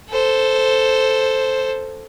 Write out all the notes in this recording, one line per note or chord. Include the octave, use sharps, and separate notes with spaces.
A4 C5